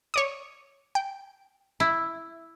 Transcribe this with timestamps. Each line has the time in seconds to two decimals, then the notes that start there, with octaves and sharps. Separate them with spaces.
0.14 C#5 D5 D#6
0.95 G5
1.80 E4